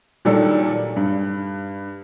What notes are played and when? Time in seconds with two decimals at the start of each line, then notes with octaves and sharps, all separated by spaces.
0.25 A#2 D#3 F#3 G3 D4 A4
0.96 G2